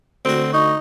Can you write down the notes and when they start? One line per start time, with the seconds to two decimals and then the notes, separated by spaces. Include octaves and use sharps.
0.25 D2 C4 F#4
0.53 D#4 C#6